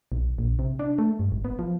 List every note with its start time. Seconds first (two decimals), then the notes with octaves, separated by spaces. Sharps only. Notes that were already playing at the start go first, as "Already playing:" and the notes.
0.12 B1
0.38 A#1
0.59 C3
0.79 D4
0.98 A3
1.19 G2
1.32 G#1
1.45 B3
1.59 F3